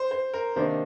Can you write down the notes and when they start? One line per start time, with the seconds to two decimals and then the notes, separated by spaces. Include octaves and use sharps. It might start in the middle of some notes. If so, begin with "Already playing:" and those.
Already playing: C5
0.11 C5
0.34 A#4
0.56 C3 D#3 A#3 D4 C5